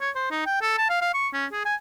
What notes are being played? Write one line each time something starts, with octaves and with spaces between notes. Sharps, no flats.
C#5
C5
D#4
G5
A4
A5
F5
F5
C#6
C#4
G#4
G#5